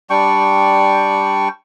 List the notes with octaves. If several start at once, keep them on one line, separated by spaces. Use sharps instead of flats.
G3 D4 G5 C#6